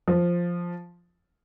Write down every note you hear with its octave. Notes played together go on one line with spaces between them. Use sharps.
F3